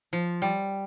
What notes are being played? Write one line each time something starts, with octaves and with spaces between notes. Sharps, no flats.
F3
G3